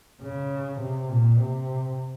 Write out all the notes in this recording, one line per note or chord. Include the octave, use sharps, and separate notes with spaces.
C#3
C3
A#2
C3